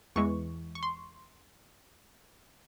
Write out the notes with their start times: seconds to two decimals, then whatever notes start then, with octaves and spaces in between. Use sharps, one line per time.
0.16 E2 E3 G#3 C#6
0.75 C#6
0.83 C6